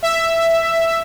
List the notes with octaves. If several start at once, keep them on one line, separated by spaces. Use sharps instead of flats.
E5